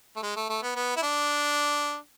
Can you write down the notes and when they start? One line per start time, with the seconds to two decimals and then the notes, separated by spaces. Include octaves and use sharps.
0.16 A3
0.23 G#3
0.36 A3
0.50 A3
0.62 B3
0.76 B3
0.97 E4
1.03 D4